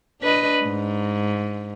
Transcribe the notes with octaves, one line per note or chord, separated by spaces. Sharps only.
D4 B4 D#5
G#2